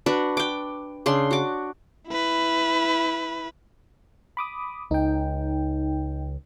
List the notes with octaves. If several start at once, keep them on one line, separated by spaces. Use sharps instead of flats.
D4 F#4 B4
G5 D6
C#3 D4 C6
F#4 D6
E4 B4
B5 D6 D#6
C#2 D#4 G5